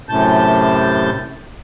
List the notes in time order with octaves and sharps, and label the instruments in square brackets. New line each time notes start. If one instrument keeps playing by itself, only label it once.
[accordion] F#2 A2 C3 A5 G6